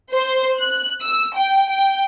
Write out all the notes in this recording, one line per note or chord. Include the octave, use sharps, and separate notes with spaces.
C5
F#6
E6
G5
G5